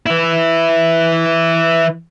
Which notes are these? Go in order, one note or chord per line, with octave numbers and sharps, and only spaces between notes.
E3 E4